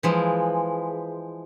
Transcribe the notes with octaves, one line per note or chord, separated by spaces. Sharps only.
E3 F3 G#3